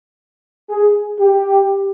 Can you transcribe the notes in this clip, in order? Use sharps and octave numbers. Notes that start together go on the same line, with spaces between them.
G#4
G4